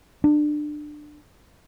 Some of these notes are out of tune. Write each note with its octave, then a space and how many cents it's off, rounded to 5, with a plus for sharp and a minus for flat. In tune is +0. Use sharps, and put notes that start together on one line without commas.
D4 +25